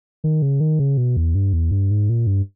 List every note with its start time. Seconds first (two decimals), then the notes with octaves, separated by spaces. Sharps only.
0.24 D#3
0.42 C#3
0.60 D#3
0.79 C#3
0.97 B2
1.17 E2
1.35 G2
1.53 E2
1.71 G2
1.91 G#2
2.10 A#2
2.27 G2